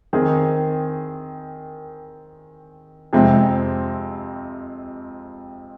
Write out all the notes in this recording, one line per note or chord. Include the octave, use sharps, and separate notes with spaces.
D#3 C4 G#4
F2 C3 G#3 C4